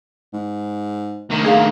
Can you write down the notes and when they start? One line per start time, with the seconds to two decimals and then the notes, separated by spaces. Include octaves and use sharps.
0.33 G#2
1.30 D2 D#3
1.45 D3 G#4 F5